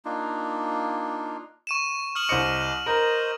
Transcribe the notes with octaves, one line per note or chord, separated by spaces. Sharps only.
A#3 D4 D#4 F4
C#6 D#7 E7
C#6 D#6 F6 F#7
C2 C5 D#5 D6 C#7
A#4 C5 D#5